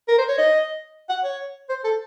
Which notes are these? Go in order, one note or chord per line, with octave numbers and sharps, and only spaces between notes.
A#4
C5
C#5
D#5
F#5
C#5
C5
A4